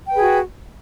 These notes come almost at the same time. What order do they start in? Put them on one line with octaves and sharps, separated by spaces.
G5 B4 G#4 F#4